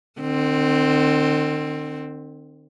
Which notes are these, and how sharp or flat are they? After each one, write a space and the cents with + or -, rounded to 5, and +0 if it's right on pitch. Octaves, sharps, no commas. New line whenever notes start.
D#3 -45 C4 +5